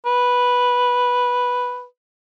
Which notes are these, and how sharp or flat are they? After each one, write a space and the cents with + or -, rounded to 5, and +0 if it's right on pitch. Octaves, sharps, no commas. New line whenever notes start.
B4 -5